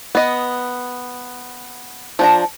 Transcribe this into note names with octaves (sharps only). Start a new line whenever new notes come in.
B3 D#5
F3 D4 A#5